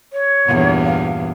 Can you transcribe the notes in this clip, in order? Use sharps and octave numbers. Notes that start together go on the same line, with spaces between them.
C#5
E2 G2 A#2
F5